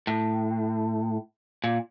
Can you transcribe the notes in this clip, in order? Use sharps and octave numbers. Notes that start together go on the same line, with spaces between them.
A2
A#2